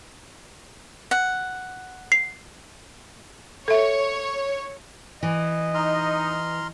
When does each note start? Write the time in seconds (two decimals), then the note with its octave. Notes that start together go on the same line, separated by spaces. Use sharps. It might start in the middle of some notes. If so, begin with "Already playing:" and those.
1.11 F#5
2.12 C7
3.68 A4 C#5 E5
5.23 E3 D#5
5.75 D#4 A#5 C6 F6